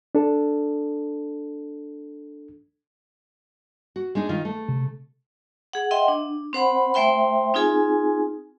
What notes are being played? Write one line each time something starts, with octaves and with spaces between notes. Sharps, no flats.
D4 A4
F#4
G#3 D4 D#4
D#3 F4
A3
C3
G#4 F#5
D#5 E5 F#5 G5 C6
D4
C4 C5 F#5 B5
A3 C5 E5 G5 C6
C4 D#4 F4 G#4 G#5